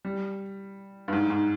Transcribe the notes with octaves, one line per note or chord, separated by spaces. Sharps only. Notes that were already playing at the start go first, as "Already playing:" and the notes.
G3
G2
G#2
G#2